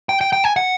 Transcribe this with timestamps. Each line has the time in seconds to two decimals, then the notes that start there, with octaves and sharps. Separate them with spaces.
0.09 G5
0.21 G5
0.33 G5
0.44 G#5
0.56 F#5